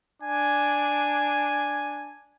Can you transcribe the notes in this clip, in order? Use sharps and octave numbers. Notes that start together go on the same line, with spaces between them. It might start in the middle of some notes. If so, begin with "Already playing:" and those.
D4 G#5